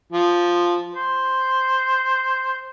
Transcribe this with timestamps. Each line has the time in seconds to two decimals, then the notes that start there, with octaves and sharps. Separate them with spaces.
0.12 F3
0.94 C5